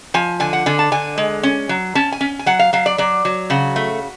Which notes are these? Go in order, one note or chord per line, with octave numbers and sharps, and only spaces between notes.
F3 G#5
D3 G#5
F#5
D3 G#5
A5
D3 G#5
G#3
C#4
F#3
C#4 A5
G#5
C#4
G#5
F#3 F#5
F5
F#3 F5
D5
F#3 D5
F#3
C#3 F#4
A3